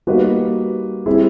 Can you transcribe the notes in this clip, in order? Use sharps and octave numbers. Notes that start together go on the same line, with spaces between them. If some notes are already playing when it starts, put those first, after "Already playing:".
G3 A#3 D#4 F#4 B4
G3 C4 E4 G#4